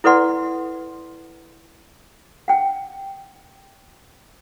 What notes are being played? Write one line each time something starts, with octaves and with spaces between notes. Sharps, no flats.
E4 A4 B4 D5 F#5 C6
F#5 G5